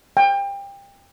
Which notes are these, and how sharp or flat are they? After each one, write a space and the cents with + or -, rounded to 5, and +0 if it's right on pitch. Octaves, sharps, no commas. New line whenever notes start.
G5 +25